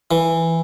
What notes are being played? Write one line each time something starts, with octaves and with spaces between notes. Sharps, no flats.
E3